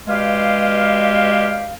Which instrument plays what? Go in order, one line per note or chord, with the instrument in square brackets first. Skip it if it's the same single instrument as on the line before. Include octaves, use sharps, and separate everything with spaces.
[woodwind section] G2 B2 G#3 G4 F5